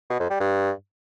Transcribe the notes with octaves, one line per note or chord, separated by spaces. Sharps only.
B2
F2
G3
G2